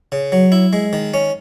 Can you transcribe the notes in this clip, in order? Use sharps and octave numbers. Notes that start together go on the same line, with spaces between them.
C#3
F#3
E4
G#3
D#3
C#4